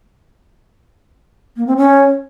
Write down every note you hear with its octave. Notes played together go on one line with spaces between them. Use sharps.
A#3
C4
C#4